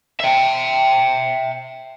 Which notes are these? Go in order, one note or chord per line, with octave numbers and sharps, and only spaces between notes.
E5 G5